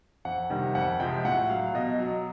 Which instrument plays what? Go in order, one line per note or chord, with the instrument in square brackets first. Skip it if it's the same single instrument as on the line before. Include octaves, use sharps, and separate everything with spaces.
[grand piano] F2 F#5
C3 D#3 G3
F2 F#5
C3 F3 G#3 G5
A2 F#5
F#3 F5
B2 D#5
F#3